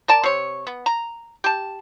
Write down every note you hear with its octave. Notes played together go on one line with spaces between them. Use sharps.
A#4 D5 A5
C3 C#5
B3
A#5
G4 A5